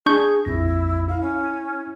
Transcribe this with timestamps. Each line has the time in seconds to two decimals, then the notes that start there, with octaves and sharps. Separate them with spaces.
0.06 D4 G#4 C#6 G6
0.45 A#1 F2 E4 A#6
1.08 E4 F5
1.20 C#4